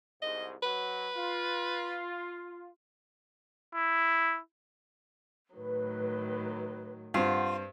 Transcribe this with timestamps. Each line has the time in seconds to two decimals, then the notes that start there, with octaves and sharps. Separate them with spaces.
0.22 C2 G#2 D#5
0.63 F#3 B4
1.16 F4
3.75 E4
5.55 A2 D#3 F#3 B4
7.14 G2 C4 F4 F#5